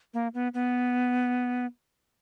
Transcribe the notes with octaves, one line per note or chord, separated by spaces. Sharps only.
A#3
B3
B3